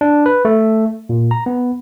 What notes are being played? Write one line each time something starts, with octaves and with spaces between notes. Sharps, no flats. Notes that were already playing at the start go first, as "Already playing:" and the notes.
D4
B4
A3
A#2
A#5
B3